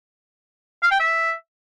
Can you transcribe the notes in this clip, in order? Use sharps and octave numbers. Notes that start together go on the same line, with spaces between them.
F5
G5
E5